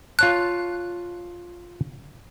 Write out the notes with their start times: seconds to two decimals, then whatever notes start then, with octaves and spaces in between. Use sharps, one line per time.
0.19 F4 C#5 A5 F#6